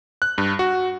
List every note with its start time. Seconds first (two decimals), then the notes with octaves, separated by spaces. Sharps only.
0.22 F#6
0.38 G2
0.59 F#4